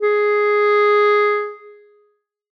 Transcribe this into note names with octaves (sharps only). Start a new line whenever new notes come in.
G#4